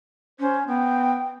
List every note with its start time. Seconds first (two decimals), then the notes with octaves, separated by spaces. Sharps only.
0.40 C#4 C5
0.68 B3 G5